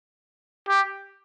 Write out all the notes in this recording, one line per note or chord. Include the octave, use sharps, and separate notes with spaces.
G4